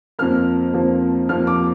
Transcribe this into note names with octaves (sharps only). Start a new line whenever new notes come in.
F2 F3 A#3 F6
F2 F3 A#3
F2 F3 A#3 F6
D6